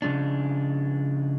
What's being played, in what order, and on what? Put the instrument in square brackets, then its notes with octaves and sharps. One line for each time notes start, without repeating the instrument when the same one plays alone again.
[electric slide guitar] C#3 F3 G#3 D4